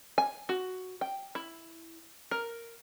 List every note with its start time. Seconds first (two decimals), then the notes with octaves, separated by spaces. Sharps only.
0.18 G#5
0.49 F#4
1.01 G5
1.35 E4
2.31 A#4